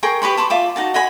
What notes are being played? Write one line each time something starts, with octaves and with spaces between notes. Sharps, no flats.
G#4 A#4 G5 C#6
G4 B4 B5 C#6
A5 B5 C6 D6
F4 E5 D6
D#4 F#4 A5
D#5 F#5 G#5 B5